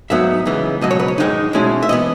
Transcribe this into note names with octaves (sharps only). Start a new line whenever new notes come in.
G#2 F#3 B3 D#4 E5
C#2 C#3 E3 G#3 B3
C#2 B2 F#3 D#5
C#5
B4
C#5
G#2 D#3 G#3 D#4
B2 G#3 C#4 E4
E5
E3 B3 D#5